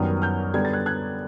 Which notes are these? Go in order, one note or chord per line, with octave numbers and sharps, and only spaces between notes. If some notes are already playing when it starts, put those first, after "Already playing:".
Already playing: F#2 D#3 G3 B3 D#6 F6
F6 G6
D3 G3 B3 G#6
A6
F#6 G#6
F#6 G#6